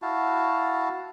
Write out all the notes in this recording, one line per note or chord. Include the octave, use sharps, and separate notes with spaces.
E4 F#4 F5 A5